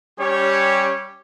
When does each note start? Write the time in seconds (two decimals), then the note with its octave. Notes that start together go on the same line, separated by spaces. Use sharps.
0.19 G3 C#4 G4 C#5